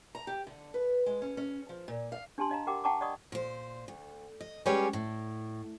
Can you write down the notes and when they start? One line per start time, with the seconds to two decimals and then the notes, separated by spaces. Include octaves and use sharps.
0.15 A#5
0.27 G4
0.47 D3
0.74 B4
1.06 G#3
1.22 C#4
1.37 C#4
1.69 F3
1.88 A#2
2.12 F5
2.38 D4 G4 G#5 A5 C6
2.50 D4 D#5 F5 A#5
2.67 G4 A#4 F#5 G5 D6
2.84 F#5 G5 A5 A#5 C#6 D6
3.01 D5 D#5 F#5 B5 C#6 D#6
3.32 A#2 C5
3.88 D2
4.41 D#5
4.66 G3 G#3 C#4 G4 B4 C#5
4.93 A2